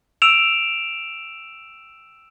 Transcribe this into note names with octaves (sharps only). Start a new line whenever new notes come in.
E6 D7 E7 F7